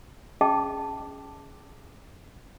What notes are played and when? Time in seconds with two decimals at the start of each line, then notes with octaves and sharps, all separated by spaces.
0.41 C#4 G#4 D#5 G5 A5 D6